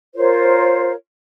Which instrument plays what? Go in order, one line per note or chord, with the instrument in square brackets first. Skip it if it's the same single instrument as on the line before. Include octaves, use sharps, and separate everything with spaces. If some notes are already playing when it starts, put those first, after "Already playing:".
[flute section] F4 A#4 C5 C#5